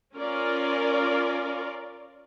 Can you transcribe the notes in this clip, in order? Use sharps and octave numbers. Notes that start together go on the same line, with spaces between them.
C#4 F4 A#4 D5